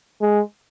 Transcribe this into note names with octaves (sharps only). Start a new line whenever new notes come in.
G#3